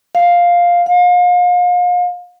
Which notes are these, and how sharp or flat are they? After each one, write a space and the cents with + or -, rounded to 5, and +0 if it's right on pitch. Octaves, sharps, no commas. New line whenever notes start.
F5 +5
F5 +35